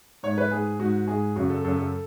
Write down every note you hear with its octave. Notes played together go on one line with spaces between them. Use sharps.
G#2 C#5
B4
G#2 G#4
G#2 F#4
G#2 G#4
F#2 C#3 F#4
A4
F#2 C#3 A4
A4